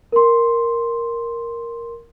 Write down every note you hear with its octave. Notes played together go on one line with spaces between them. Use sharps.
A#4 C6